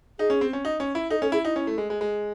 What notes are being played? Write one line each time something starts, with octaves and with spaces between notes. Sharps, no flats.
D#4 G#4
C#4
C4
C#4
D#4
C#4
E4
D#4 A4
C#4 A4
E4 G#4
D#4 E4
C#4
A3
G#3
G#3
G#3